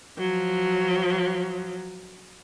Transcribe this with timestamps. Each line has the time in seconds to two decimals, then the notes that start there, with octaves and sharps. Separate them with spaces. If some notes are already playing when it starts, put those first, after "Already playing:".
0.18 F3 F#3